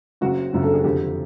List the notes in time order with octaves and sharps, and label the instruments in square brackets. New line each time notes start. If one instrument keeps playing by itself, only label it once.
[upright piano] F#1 F#2 C#3 F#4
F#1 F#2 C#3
A4
G#4
F1 F2 D3 F3 G4